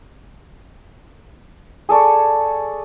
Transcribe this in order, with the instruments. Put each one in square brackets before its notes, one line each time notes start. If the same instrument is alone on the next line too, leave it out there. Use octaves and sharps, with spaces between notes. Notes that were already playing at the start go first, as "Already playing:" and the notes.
[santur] G#4 A4 D5 C#6